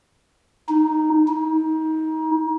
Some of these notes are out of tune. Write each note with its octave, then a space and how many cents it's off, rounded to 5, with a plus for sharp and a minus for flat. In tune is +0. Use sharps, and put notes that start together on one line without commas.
D#4 -5
D#4 +25